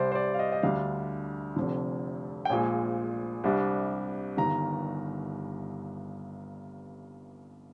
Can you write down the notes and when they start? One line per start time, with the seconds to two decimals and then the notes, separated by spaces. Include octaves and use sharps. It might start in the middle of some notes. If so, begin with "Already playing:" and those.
Already playing: C2 C3 G3 C5 D5
0.12 C5
0.15 D5
0.34 F5
0.39 D#5
0.52 D#5
0.63 D2 D3 G3 D4 F5
1.56 F1 F2 D3
2.45 G5
2.50 A#1 A#2 G#3 G#5
3.44 C2 C3 G3 D4
4.37 G1 G2 D#3 A#5